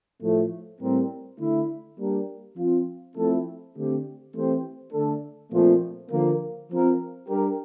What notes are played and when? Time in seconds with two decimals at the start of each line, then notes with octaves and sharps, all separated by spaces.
0.22 A2 F3 A3
0.81 A2 G3 C4 G4 A#4
1.40 D3 A3 E4
1.98 G3 A#3 D4 G4 A#4
2.57 F3 C4 F4
3.16 F3 A3 C4 E4 A4
3.76 D3 A3 C4 G4
4.34 E3 A3 C4 G4 C5
4.93 D3 A3 D4 A4
5.52 A#2 F3 A3 C4 F4
6.11 D3 F3 A#3
6.70 F3 C4 F4 A#4
7.28 G3 D4 G4 A#4